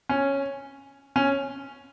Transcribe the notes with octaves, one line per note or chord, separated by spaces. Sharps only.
C#4
C#4